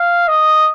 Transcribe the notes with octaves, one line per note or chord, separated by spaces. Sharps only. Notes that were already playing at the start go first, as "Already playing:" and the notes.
Already playing: F5
D#5